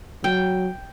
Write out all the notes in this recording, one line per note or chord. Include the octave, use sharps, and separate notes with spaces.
F#3 G5